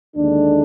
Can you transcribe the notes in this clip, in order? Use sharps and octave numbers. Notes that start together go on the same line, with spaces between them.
D#2 D3 G#3 D4